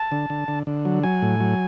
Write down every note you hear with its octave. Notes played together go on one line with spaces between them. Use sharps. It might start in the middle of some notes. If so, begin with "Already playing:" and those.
Already playing: A5
D3
D3
D3
D3
F#3
F#3 G#5
A2
F#3